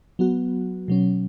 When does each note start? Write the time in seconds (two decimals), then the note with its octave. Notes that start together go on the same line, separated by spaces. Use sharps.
0.19 F#3 B3 F#4
0.88 B2 F#3 C#4